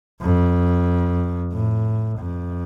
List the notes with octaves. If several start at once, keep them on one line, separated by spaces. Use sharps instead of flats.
F2
A2
F2